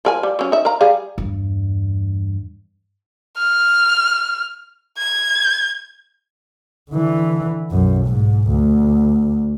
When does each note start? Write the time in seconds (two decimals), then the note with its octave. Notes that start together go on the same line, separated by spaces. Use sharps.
0.05 F3 A#4 G#5
0.23 G3
0.39 F#3 C#4
0.52 D#4 E5
0.65 A#4 F5 A#5
0.81 G3 G#4 F5
1.18 E2 G2
3.37 F6
4.98 G#6
6.91 D3 E3
7.71 B1 F#2
8.06 G#2
8.48 D2